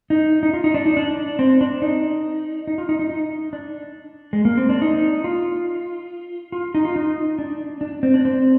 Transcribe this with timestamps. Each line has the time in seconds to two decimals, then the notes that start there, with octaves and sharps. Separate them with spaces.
0.10 D#4
0.43 D#4
0.53 F4
0.64 D#4
0.74 D4
0.86 D#4
0.97 D4
1.39 C4
1.61 D4
1.82 D#4
2.67 D#4
2.78 F4
2.89 D#4
2.99 D#4
3.10 D#4
3.53 D4
4.33 G#3
4.45 A#3
4.57 C4
4.69 D4
4.82 D#4
5.24 F4
6.52 F4
6.75 D#4
6.85 F4
6.96 D#4
7.39 D4
7.81 D4
8.03 C4
8.14 D4
8.25 C4